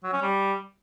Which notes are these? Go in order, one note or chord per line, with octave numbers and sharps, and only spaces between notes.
F#3
C#4
G3